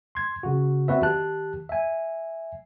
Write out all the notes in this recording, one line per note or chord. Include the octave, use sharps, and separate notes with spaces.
C6 G#6
C#3 F#4
B3 C4 F#4 B4 D5 E5
D#3 G4 A5 F#6
E5 G#5